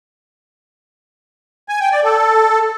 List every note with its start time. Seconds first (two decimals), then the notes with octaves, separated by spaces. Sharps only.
1.69 G#5
1.81 G5
1.92 D5
2.04 A4